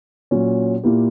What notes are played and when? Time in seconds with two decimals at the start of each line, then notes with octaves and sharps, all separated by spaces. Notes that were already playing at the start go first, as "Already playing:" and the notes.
0.31 A#2 F#3 C#4
0.83 A#2 A#3 E4 G4